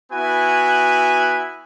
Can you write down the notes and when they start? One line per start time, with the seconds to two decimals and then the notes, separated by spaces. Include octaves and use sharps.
0.12 B3 E4 F#4 G#5